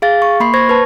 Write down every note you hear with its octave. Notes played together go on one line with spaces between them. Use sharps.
G#4 F5 A6
C#6
A#3 B5 C6 C7
C5 C#6 G#6 A#6
B4 A5